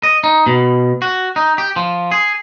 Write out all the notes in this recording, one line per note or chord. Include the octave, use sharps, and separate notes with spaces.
D#5
D#4
B2
F#4
D#4
G4
F3
G#4